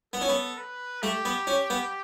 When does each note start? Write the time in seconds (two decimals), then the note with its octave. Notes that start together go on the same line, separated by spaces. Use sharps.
0.13 B3 A4
0.21 C#4
0.29 B3
0.57 B4
1.02 A3 G4
1.25 B3
1.47 C#4
1.70 B3